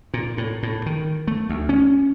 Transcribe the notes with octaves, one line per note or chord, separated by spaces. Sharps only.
A#2
A2
A2
D#3
A3
D2
C#4